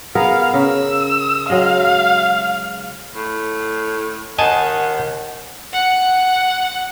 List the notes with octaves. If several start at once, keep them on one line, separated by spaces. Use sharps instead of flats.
B3 G#4 A#4 F5
C#3 A#4 E6
F#3 G#3 D#5 F5
A2
D#2 D#5 F#5 G#5 A5
F#5